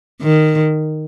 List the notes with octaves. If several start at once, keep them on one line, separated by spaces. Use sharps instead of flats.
D#3